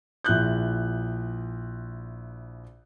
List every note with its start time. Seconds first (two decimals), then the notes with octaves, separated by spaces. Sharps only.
0.24 A#1 E4 F#6 G6